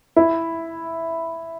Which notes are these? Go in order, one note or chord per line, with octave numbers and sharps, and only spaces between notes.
E4